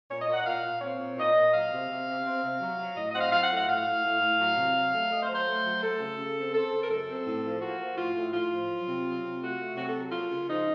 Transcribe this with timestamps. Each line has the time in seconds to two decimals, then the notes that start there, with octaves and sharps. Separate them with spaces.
0.10 A#2 C#5
0.21 D#5
0.28 A#2
0.33 F#5
0.46 A#2 F5
0.64 A#2
0.81 C4 C#5
0.99 A#2
1.17 A#2 D#5
1.34 A#2
1.53 F#3 F5
1.71 C3
1.89 C3
2.07 C3
2.24 C4
2.43 C3
2.60 F#3
2.79 F#3
2.96 A2 D#5
3.08 D#5
3.13 C4 F#5
3.20 F5
3.32 F#3 F5
3.43 F#5
3.50 A2
3.55 F#5
3.68 A2 F5
3.86 A2
4.03 A2
4.21 A2
4.39 F#3
4.57 C3
4.74 F#3
4.93 A3
5.11 A3 D#5
5.23 C5
5.29 F#3
5.34 C5
5.46 A3
5.65 F#3
5.82 A3 A4
6.00 C#3
6.19 C#3
6.36 C4
6.54 C4 A4
6.72 C#3
6.83 A#4
6.90 F#2 A4
7.08 C4
7.26 A2
7.44 F3
7.62 A#3 F#4
7.79 F3
7.97 A2 F4
8.15 A2
8.33 A2 F4
8.51 F3
8.69 F#3
8.87 C3
9.05 F#3
9.23 C3
9.40 A3 F#4
9.58 A3
9.76 C3 F#4
9.88 A4
9.94 F#3
10.12 A#3 F4
10.30 C#3
10.47 F3 D#4